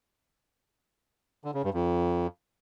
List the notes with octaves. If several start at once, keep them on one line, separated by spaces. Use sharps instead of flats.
D3
C#3
G2
F2